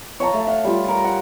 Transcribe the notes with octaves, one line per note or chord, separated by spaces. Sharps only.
C#5 F5 A5 A#5
A3
F5 F#5
G3 F4
A#4
F#5